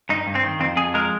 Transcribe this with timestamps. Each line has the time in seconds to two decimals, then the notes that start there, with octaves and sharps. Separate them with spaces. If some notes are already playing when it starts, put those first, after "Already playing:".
0.09 G2 D#4
0.27 G2
0.35 C4
0.44 D#3
0.60 F2 C4
0.76 F2 G#4
0.94 G#3 A#4